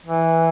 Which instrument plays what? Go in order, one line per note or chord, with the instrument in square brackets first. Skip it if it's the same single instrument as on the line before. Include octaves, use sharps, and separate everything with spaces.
[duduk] E3